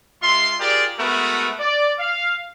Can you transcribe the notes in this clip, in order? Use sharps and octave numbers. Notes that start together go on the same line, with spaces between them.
G#3 F4 E5 C6
F4 G4 G#4 A#4 D5
G#3 A3 B3 F#4 A#4 B4
D5
F5